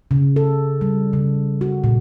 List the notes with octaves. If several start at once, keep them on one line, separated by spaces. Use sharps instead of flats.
C#3
A4
G3
C#3
F#4
A#2